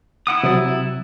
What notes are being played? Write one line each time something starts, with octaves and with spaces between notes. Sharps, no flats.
E4 F#5 D#6
C3 F#3 A6